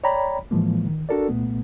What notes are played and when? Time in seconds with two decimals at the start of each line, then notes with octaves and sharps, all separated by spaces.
0.04 C#5 D5 G5 A#5 B5
0.51 A2 E3 F3 G#3 A#3
0.86 D#3
1.09 D4 F#4 A4 A#4 D5
1.28 C2 A#2 A3 B3